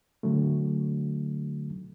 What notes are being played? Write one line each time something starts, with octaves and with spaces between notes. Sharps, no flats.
D3 F#3 A3